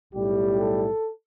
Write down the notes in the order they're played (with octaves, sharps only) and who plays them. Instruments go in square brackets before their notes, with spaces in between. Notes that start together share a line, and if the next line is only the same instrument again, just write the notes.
[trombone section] B1 A2 G3 G4
A4